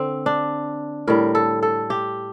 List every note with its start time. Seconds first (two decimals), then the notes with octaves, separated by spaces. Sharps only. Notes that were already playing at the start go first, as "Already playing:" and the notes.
Already playing: D3 C4
0.26 D4
1.07 A2 G3 A#4
1.35 A4
1.63 A4
1.90 G4